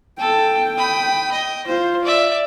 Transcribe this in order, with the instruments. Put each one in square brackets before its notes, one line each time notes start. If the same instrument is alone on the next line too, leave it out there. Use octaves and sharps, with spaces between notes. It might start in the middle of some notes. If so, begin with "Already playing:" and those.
[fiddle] A4 [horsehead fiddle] G5
[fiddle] B5 D#6
D#5
[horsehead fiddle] F4 [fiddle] C5
[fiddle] D5 E5